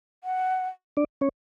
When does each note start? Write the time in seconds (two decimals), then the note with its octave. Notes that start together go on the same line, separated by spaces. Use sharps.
0.24 F#5
0.97 D4 D5
1.21 C#4 C#5